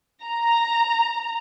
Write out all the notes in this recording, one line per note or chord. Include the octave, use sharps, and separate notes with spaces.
A#5